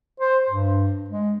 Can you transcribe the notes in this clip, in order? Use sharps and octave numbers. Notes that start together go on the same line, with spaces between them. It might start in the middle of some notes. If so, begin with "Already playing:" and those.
C5
G2
G#3